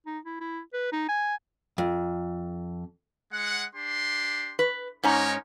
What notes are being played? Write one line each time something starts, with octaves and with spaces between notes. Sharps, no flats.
D#4
E4
E4
B4
D#4
G#5
F2
G#3 F#5
D4 G4 C6
B4
G#2 C#4 D#4 A#4 C#5 A#5